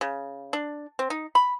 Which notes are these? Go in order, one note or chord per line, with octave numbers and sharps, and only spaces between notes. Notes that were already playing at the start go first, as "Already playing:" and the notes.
C#3
D4
C4
D#4
B5